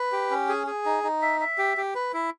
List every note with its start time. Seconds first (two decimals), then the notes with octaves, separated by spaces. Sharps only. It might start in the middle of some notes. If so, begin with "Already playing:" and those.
Already playing: B4
0.12 G4
0.31 C#4
0.49 G#4
0.67 G#4
0.85 D#4
1.04 D#4
1.22 E5
1.41 E5
1.58 G4
1.77 G4
1.95 B4
2.13 E4